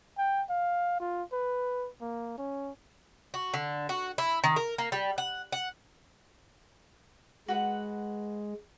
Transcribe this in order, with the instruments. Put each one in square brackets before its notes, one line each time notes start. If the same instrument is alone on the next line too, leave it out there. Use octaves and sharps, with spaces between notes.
[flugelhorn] G5
F5
F4
B4
A#3
C#4
[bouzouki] F#4
D3
F#4
E4
D#3
A#4
A#3
G3
F#5
F#5
[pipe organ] G#3 [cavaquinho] F#4 B4 F#5